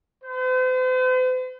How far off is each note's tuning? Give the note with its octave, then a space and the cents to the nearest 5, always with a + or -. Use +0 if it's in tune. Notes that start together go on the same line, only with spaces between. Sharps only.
C5 -45